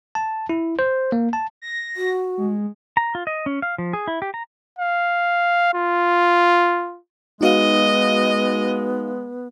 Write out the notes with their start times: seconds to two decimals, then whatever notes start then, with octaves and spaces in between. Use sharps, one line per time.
0.15 A5
0.49 E4
0.79 C5
1.12 A#3
1.33 A5
1.62 A#6
1.96 F#4
2.38 G#3
2.97 A#5
3.15 F4
3.27 D#5
3.46 C#4
3.62 F5
3.78 F3
3.93 G#4
4.08 E4
4.22 G4
4.34 A#5
4.79 F5
5.74 F4
7.41 G#3 B3 D#4 F#4 D#5 F5